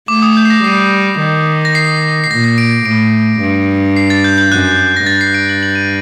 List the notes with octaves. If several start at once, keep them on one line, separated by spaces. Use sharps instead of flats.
A3 D6
D#6
G6
C7
A#6
G3 C7
D#3
A#6
C7
C7
A#2 A#6
A#6
D7
A2 D7
G2
C7
A6
G6
G6
F#2 F#6
A#6
G2 A6
C7
D7
F#7
F#7
D#7